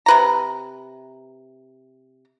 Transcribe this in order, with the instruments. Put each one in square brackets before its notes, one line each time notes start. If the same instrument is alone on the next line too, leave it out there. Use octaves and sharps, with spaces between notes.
[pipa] C3 B4 A#5